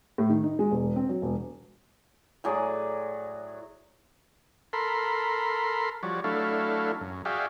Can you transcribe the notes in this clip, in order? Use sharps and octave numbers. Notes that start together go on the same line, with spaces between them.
A2
D#3
D#4
G#3
E1
C4
F#3
E1
A2 F#3 G#4 D5
A4 A#4 B5 C6
F3 G3 F#4 C#5 D5
F#3 A3 D4 E4 A4 F5
F#2
F#4 G#4 D5 E5 F5 G5